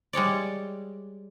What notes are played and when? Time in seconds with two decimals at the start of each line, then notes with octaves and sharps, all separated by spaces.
0.13 G3 G#3 C#5 D5